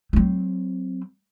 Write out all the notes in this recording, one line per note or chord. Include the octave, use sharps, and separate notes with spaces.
F#3 C4